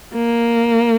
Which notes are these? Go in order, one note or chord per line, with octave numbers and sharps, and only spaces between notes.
A#3